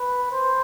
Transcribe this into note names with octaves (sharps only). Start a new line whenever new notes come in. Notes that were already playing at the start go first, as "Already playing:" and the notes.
Already playing: B4
C5